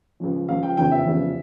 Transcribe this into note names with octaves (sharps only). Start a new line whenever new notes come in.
C#2 C#3 F3
C#2 C#3 F3 F5
G5
F1 E2 C#3 F3 G5
E5
F1 E2 C#3 F3